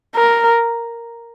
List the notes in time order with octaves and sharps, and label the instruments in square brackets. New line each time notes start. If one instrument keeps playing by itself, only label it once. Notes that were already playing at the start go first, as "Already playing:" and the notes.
[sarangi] A#4